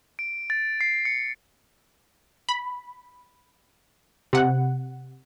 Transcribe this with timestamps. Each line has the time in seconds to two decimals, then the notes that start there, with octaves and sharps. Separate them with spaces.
0.19 D7
0.50 A6
0.81 C7
1.05 C#7
2.49 B5
4.33 C3 F#5